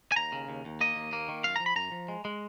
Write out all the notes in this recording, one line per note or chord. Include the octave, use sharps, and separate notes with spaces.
G#5
D#2 A#5
C#3
D#2
D#2
A#3 D#5
D#2
A#3
D#3
F#2 F5
F3 A#5
B5
F#2 A#5
F3
G#3
G#3